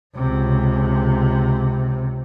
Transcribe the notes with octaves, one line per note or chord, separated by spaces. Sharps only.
C#2 C3